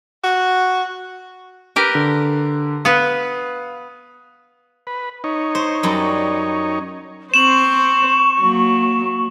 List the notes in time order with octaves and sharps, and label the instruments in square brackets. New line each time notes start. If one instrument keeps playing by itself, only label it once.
[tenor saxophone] F#4
[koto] G4 A#4 B4
[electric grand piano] D3
[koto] B3 B4 [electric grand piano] F5 D#6
[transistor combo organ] B4
D#4 C#5
[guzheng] C5
F#2 G3
[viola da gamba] C4 C5 [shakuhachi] C#6 [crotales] E7 F#7
[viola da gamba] F#3 A#3